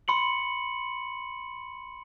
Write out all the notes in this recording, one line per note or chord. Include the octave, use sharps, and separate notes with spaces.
B5 C6 C#7 F#7